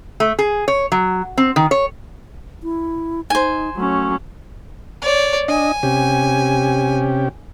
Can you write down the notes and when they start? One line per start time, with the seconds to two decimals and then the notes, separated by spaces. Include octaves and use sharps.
0.20 A3
0.39 G#4
0.68 C#5
0.92 F#3
1.38 C4
1.56 D#3
1.71 C#5
2.63 E4
3.30 D#4 C5 G#5
3.77 F#3 A3 C#4
5.02 C#5 D5
5.48 D4 D#5 G#5
5.83 C3 C#4 G4